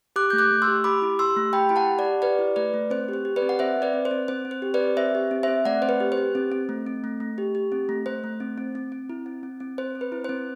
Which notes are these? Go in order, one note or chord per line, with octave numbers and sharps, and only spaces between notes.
G4 D6 F#6
A3 G6
D6 F#6
A3
C6 E6
G4
G4 B5 D6
E4
G4 C6 E6
A3
G4 G5 B5
E4 B5
F#5 A5
G4
D5 F#5
G4
G4 B4 D5
E4
A3 B4 D5
A3
C4 C5
G4 C5
G4
B4 D5
C4
F#5
C4 C5 E5
C4
B4 D5
C4
C5
C4
C4 C5
C4
C5
G4
B4 D5
C4
C4 C5 E5
G4
C4
C5 E5
C4
A3 D5 F#5
C4 C5
B4
G4
C5
G4
C4
C4
A3
C4
A3
A3
G4
G4
C4
A3
A3 C5
A3
C4
C4
C4
C4
E4
C4
C4
C4
C4 C5
C4
B4
E4
C4 C5